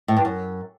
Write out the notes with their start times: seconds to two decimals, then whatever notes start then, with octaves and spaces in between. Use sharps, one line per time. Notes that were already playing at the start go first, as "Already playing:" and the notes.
0.08 A2
0.17 G2
0.25 F#2